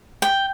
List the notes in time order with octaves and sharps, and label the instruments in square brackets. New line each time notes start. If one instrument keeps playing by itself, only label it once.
[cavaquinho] G5